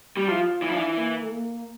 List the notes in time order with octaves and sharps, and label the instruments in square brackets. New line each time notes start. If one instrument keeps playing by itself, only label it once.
[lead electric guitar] G3 [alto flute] G4
[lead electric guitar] F3 [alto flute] E4
[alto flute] F4
[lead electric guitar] E3 [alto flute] E4
[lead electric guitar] F3
[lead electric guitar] E3 [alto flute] D4
[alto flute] E4
A#3
A3
A#3